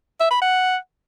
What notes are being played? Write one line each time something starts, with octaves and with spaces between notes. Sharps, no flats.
E5
B5
F#5